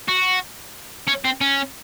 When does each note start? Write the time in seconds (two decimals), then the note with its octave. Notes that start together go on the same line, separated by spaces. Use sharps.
0.09 F#4
1.08 C#4
1.25 C4
1.41 C#4